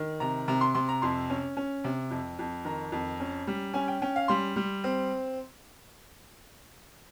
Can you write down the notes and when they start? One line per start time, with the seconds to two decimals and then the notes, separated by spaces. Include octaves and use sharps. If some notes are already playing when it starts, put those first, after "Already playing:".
Already playing: D#3
0.20 C3 A#5
0.48 C3 A#5
0.61 C6
0.74 C3 C6
0.89 A#5
1.02 F2 C6
1.30 C#4
1.57 C#4
1.84 C3
2.11 F2
2.39 F2
2.65 D#3 A#5
2.92 F2
3.20 C#4
3.47 G3
3.74 C#4 G#5
3.88 G5
4.02 C#4 G5
4.16 F5
4.28 G3 C6
4.56 G3
4.84 C4